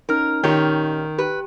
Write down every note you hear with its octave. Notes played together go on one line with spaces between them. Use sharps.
C#4 D#4 A#4 F6
A#2 D#3 G4 C#5
G4 B4